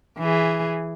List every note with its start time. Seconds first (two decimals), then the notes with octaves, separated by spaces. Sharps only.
0.19 E3 G#4